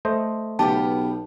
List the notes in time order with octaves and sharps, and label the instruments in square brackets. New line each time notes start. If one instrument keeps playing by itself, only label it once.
[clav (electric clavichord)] A3 C5 D#5
[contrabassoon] B1 [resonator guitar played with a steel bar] C#3 B3 G4 [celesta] A5